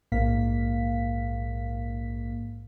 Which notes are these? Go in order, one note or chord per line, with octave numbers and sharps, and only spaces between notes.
A#1 G#2 A#3 F5 B6